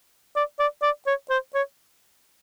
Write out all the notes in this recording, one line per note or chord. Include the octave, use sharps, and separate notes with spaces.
D5
D5
D5
C#5
C5
C#5